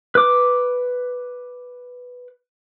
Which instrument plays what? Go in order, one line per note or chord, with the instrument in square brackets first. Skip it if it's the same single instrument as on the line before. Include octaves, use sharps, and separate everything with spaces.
[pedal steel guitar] B4 D6